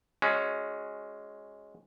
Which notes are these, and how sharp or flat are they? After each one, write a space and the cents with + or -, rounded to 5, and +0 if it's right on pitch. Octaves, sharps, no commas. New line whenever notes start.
G#3 +0 C#4 +0 F#4 -20